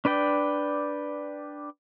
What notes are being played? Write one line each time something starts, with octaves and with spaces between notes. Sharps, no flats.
D4 B4 D5 G5